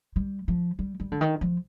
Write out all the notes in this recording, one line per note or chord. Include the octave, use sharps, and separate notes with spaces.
G3
F3
G3
G3
D3
D#3
F3